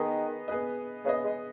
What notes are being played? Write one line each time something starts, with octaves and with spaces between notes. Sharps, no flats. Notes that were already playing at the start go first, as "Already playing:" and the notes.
Already playing: D#3 B3 G#4 B4 D#5
B3 G#4 B4 D#5
C#3 B3 G#4 B4 D#5
G#3